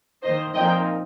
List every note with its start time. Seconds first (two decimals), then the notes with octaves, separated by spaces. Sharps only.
0.23 D#3 A#3 D#4 C5 D#5
0.54 A#2 F3 C4 D#4 D#5 G5